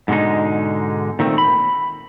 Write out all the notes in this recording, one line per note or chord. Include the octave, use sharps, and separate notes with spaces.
G#2 B2 D3 G#3 D#4
A#2 D#3 A3 C4
B5